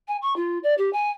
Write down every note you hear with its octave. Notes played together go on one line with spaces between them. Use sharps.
G#5
C#6
F4
D5
G4
G#5